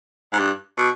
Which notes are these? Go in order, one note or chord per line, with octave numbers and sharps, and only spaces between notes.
G#2
G2
B2